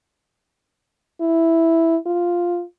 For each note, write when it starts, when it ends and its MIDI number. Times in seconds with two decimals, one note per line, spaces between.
1.21 1.97 64
2.06 2.63 65